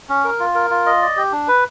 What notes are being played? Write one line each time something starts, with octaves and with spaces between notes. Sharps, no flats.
C#4
A#4
F4
A#4
F4
D#5
D5
G4
D4
B4